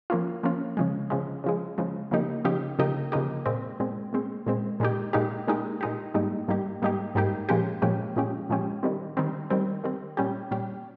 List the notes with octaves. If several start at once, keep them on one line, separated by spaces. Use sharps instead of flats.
F3 A#3 C#4 F4
F3 A#3 C#4 F4
C#3 F3 G#3
C#3 F3 G#3
C#3 F3 G#3
C#3 F3 G#3
C#3 F3 A#3 D#4 G4
C#3 F3 A#3 D#4 G4
C#3 F3 A#3 D#4 G4
C#3 F3 A#3 D#4 G4
A#2 G#3 C4
A#2 G#3 C4
A#2 G#3 C4
A#2 G#3 C4
A#2 G#3 D#4 G4
A#2 G#3 D#4 G4
A#2 G#3 D#4 G4
A#2 G#3 D#4 G4
G#2 G3 A#3 D#4 G4
G#2 G3 A#3 D#4 G4
G#2 G3 A#3 D#4 G4
G#2 G3 A#3 D#4 G4
A#2 F3 G#3 C#4 G4
A#2 F3 G#3 C#4 G4
A#2 F3 G#3 C#4 G4
A#2 F3 G#3 C#4 G4
D#3 G3 C4
D#3 G3 C4
D#3 G3 C4
D#3 G3 C4
A#2 G3 C#4 G4
A#2 G3 C#4 G4